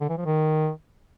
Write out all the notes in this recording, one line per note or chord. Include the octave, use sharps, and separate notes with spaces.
D3
E3
F3
D#3